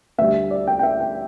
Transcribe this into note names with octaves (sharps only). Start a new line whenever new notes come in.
D2 D3 G3 E5
D5
G5
G5
E5
G5